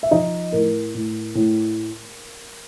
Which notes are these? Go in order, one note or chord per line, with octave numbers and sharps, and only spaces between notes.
E5
F3 D#4 D#5
A2 A#4
A2
A2